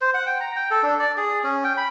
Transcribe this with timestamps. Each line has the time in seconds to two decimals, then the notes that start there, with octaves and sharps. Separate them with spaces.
0.01 C5
0.14 F#5
0.26 G5
0.40 A#5
0.56 G5
0.71 A4
0.83 D4
0.99 D5
1.17 G#4
1.44 C#4
1.64 G5
1.77 B5